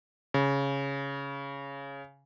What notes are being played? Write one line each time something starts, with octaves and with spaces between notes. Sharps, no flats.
C#3